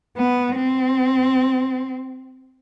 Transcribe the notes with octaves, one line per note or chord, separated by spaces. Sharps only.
B3
C4